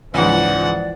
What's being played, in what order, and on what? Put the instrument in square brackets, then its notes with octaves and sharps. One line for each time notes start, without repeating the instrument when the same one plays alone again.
[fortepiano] C#2 G#2 [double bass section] E3 F3 G#3 [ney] D5 [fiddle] F#5